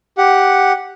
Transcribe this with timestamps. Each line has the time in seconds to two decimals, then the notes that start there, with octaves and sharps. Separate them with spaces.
0.18 G4 F#5